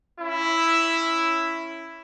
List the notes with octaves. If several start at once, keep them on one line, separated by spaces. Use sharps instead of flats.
C#4 E4